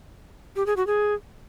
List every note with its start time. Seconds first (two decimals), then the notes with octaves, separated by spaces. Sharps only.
0.56 G4
0.66 G#4
0.77 F#4
0.87 G#4